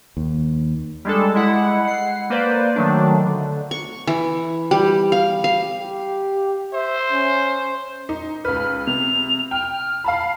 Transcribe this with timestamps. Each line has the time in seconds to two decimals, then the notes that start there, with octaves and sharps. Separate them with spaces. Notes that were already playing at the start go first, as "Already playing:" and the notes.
0.17 D#2
1.05 G3 G#3 D4 A4
1.35 G#3 E4 F#5
1.85 F#5 C7
2.30 A#3 B4 C5 D5
2.76 D#3 F#3 A3 D4
3.26 D3
3.71 C#6
4.07 E3
4.71 G3
5.12 F5
5.44 F5
5.79 G4
6.74 C5 E5
7.12 C#4
8.09 D#4
8.45 C#2 B4 F6
8.87 C3 F7
9.51 G5 F6
10.04 F5 A5 B5